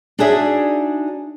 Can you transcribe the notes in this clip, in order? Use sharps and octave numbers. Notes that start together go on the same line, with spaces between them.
D4 D#4 F#4 G#4 D5 E5